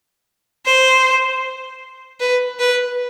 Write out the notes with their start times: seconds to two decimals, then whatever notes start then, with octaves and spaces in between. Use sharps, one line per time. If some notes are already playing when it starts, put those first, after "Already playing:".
0.66 C5
2.20 B4
2.59 B4